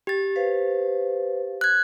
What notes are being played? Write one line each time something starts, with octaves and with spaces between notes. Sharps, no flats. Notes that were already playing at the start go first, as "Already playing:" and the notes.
G4 A6
B4 C5 F5
F#6 G#6